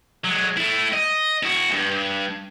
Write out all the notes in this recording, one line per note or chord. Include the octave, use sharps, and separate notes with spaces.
F#3 G#3
A3 E4
D#5
E4 F#4
E2 G2